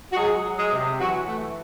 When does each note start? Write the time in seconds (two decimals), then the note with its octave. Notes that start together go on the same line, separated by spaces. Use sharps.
0.12 F#4
0.16 F#3 G#3 G#4
0.45 F#3
0.58 G#3 G#4
0.72 C3
1.00 E3 F#3 F#4
1.28 E3 A3